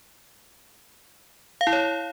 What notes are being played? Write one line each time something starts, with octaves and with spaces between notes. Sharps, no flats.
F5
E4
C#5